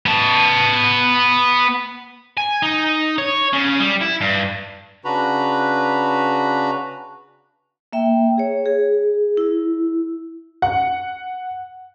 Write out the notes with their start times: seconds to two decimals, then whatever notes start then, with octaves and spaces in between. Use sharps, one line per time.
0.06 B3 A5
2.37 G#5
2.63 D#4
3.18 C#5
3.53 C#3
3.80 G3
4.01 E4
4.21 G2
5.05 C#3 D4 F#4 B4 A#5 B5
7.93 A#3 E5 G5
8.38 G#4 C#5
8.66 G#4
9.37 E4
10.62 F#5